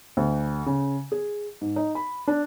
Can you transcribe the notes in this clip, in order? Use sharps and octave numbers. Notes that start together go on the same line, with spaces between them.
D2
C#3
G#4
G#2
D#4
B5
D4